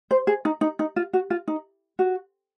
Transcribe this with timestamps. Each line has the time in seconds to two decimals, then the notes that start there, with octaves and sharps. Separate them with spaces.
0.11 C5
0.27 G#4
0.45 D#4
0.61 D#4
0.79 D#4
0.96 F4
1.13 F#4
1.30 F4
1.48 D#4
1.99 F#4